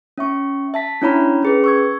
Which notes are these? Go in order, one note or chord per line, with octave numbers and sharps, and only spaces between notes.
C#4 E5 C#6
E5 A5 B6
C#4 D4 E4 C#5 A#5 B5
C#4 G#4 B4
C#6 E6 G#6